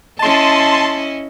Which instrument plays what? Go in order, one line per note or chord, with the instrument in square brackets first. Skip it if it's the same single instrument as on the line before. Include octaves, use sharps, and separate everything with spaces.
[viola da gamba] C#4 E4 D#5 [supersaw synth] A5 C6